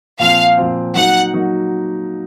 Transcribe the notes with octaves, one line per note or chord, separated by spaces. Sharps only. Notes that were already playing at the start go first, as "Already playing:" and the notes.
A#2 F3 C4 F5
A#2 F3 C4
F#3 A#3 D#4 F#4 F#5
F#3 A#3 D#4 F#4